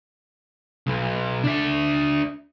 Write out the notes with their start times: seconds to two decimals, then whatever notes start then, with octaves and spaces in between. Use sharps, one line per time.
0.87 B1
1.44 D4 E5